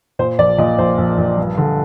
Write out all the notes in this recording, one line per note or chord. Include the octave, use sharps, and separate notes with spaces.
A#2 C5
A#1 D5
A#2 D#5
A#1 C5
A#1
A#1
G2
D3